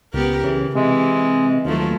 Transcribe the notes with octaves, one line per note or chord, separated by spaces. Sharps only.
C#2 B3 G4 A#4
C#3 E3
C3 E3 G#3
D#2 F3 F#3 A3